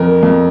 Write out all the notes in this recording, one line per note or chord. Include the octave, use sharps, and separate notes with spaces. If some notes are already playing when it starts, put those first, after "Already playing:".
Already playing: F2 A#4
F2